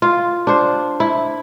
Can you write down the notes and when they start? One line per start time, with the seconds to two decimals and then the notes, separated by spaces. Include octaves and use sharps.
0.02 F4
0.47 D4 C5
1.00 E4